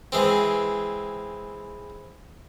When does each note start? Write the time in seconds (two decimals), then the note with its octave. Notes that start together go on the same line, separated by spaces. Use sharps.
0.12 E3 G#3 C4